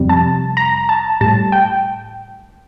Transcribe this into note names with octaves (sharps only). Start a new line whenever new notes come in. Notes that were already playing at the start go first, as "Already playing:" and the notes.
Already playing: F2 C3 G3
A5
A#5
A5
A2 G3 A5
G5